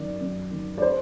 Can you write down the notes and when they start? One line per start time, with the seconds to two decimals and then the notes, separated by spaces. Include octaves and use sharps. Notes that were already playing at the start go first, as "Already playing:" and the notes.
Already playing: F#2 D#3 D5
0.20 F#2
0.51 D#3
0.78 D5
0.82 C5